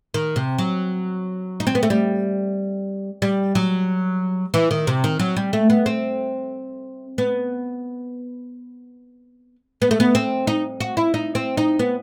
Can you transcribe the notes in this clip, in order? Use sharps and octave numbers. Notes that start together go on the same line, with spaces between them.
D#3
C3
F#3
D#4
C4
B3
A3
G3
G3
F#3
E3
D#3
C3
D#3
F#3
G3
A3
B3
C4
B3
B3
A3
B3
C4
D#4
F#4
E4
D#4
C4
D#4
B3